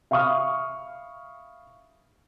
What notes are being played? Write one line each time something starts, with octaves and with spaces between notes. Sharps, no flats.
E5 F5 B5 C#6 D#6 F6